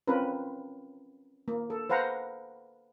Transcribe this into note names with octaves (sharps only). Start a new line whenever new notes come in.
C4 C#4 F4 A#4 B4
A#3
A4
B4 C5 F5 F#5 A#5